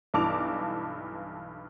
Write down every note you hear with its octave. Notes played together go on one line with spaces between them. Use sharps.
B1 G2 E3 A5 D6 F7